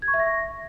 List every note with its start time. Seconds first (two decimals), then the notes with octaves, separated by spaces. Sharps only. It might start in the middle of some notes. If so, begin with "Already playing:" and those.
0.02 G#6
0.08 C#6
0.14 E5
0.19 A#6